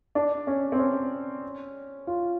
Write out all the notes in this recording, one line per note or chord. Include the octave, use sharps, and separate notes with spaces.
D4
C#4
C4
C#4
F4